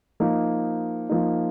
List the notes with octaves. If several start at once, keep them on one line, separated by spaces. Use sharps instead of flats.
F3 A#3 D#4
F3 A#3 D#4